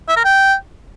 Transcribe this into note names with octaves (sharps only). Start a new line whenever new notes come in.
E5
A#4
G5